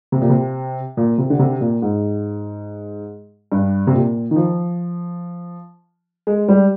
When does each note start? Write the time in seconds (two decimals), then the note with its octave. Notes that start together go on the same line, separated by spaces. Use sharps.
0.12 C3
0.21 A#2
0.30 C3
0.97 A#2
1.18 C3
1.30 D3
1.39 C3
1.61 A#2
1.82 G#2
3.52 G2
3.87 C3
3.94 A#2
4.31 D#3
4.36 F3
6.27 G#3
6.48 G3